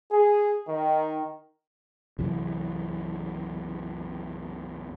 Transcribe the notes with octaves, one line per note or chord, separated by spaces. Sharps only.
G#4
D#3
C2 F#2 E3